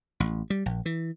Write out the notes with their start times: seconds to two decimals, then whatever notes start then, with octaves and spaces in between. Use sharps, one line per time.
0.20 A1
0.50 G3
0.66 A#1
0.86 E3